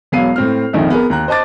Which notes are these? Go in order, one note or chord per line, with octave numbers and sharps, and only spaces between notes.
E1 F#3 B3 F5 C7 D#7
A2 C4 F6
A#1 F2 D#3 D#4 E5
B3 G#4 A#4
D#2 A#5 F#6
C5 D#5 A5 D6 A6